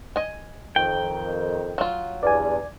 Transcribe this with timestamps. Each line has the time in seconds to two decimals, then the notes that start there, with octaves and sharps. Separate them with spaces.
0.16 D#5 G#5
0.76 F2 D#3 G5
1.78 F#3 F4
2.23 E2 G2 D5 G#5